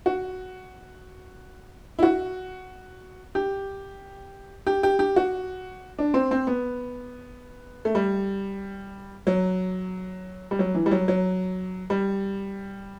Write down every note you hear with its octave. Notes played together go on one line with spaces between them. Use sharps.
F#4
E4
F#4
G4
G4
G4
G4
F#4
D4
C4
C4
B3
A3
G3
F#3
G3
F#3
E3
G3
F#3
F#3
G3